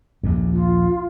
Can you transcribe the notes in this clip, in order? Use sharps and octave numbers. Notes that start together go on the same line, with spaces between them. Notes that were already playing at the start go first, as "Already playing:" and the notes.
A#1 D#2
F4